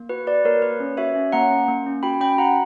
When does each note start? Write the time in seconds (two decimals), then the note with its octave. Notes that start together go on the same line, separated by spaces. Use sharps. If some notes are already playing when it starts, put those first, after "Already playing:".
Already playing: A#3
0.09 F#4 B4
0.27 F#4 B4 D5
0.45 A#3 A#4 C#5
0.62 A#3 B4
0.80 C#4
0.97 F#4 C#5 E5
1.16 C#4
1.32 A#3 F#5 A#5
1.51 C#4
1.68 A#3
1.86 C#4
2.03 F#4 G5 B5
2.20 C#4 G5 B5
2.38 F#4 F#5 A#5